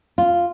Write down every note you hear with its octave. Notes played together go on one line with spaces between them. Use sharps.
F4